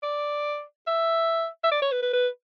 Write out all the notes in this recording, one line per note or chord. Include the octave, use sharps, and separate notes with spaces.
D5
E5
E5
D5
C#5
B4
B4
B4